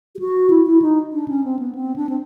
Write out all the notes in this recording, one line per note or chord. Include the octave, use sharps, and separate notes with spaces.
G4
F#4
E4
E4
D#4
D4
C#4
C4
B3
C4
D4
C4